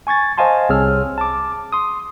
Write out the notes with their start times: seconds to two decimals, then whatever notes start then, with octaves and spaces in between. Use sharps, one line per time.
0.07 G#5 C#6 G#6 A6
0.38 C5 D#5 F5 G#5 A5 C6
0.69 C2 C4 G#4 C#5 E6 F6
1.18 A5 D6
1.73 C6 D#6